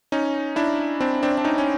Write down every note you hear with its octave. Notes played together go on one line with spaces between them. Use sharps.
C#4 D#4
D4 E4
C4 D4
C4 D4
D4
C#4 D#4
C#4